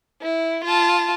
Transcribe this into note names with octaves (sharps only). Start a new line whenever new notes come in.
E4
F4 A5